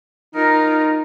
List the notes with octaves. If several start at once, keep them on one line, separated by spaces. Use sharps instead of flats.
D#4 F4 A#4